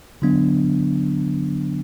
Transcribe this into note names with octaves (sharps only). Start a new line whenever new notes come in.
D3 F#3 B3 D4